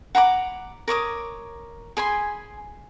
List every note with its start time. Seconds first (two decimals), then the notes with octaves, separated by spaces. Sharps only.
0.15 F#5 A#5 B5 D6
0.88 A#4 C#5 D6 D#6
1.97 G#4 G#5 B5 C6